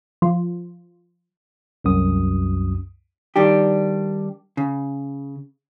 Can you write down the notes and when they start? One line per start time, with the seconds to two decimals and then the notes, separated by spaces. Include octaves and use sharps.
0.22 F3
1.84 C2 F#2 D#6
3.36 D#3 G3 D4 G4
4.57 C#3